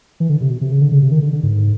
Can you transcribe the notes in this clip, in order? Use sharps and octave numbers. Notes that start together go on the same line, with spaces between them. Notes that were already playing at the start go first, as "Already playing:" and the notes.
E3
D3
C3
B2
C3
C#3
D3
C#3
C3
D#3
D3
D3
G#2